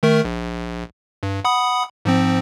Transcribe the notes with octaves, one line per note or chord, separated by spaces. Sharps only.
D#3 A3 A#4
A#1
G2
F#5 B5 D#6
G#2 F3 C4